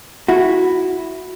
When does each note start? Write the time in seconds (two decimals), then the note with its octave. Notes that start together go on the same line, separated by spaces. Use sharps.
0.28 E4 F#4